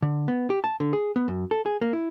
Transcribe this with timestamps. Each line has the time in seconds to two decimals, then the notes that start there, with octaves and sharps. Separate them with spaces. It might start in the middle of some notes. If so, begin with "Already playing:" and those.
0.02 D3
0.28 B3
0.50 G4
0.64 A5
0.80 D3
0.93 G#4
1.16 B3
1.28 F#2
1.51 A4
1.66 G#4
1.81 A#3
1.93 E4